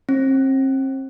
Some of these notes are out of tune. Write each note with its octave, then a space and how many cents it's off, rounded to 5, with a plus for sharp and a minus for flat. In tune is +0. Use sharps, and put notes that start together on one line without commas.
C4 +35